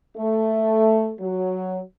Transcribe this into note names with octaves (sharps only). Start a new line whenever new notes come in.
A3
F#3